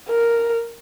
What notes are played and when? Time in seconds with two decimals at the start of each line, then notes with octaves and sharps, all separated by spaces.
0.08 A#4